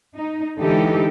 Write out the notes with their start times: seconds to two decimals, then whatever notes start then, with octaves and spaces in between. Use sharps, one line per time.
0.18 D#4
0.59 D3 E3 G#3 D#4 G4 A4